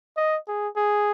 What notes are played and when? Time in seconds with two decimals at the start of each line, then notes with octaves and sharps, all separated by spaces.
0.17 D#5
0.48 G#4
0.76 G#4